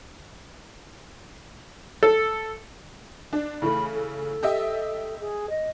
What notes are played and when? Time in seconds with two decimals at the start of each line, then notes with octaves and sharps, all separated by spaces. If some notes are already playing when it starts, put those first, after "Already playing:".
2.03 A4
3.33 D4
3.62 C#3 E3 A3 B5
3.94 A4
4.43 G4 D#5 E5
5.20 G#4
5.50 D#5